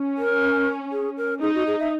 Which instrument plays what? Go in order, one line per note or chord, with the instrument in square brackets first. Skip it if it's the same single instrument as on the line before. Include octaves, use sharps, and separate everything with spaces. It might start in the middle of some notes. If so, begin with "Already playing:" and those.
Already playing: [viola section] C#4
[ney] A#4
G#4
A#4
[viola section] D#4 [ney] G#4
[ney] F#4
G#4
E5